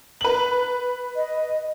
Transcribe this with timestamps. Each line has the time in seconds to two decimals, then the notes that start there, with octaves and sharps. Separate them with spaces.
0.21 B4 F#7
1.16 D#5